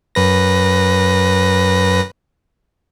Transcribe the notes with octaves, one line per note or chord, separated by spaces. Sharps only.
F#2 B4 A#6